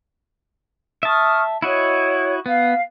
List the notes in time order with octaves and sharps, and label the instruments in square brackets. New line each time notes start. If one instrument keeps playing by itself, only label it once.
[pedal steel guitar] E5 A5 [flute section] C#6 D#6 F6
[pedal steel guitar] E4 F#4 D#5 [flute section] C#5 F#5
[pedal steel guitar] B3 [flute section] F5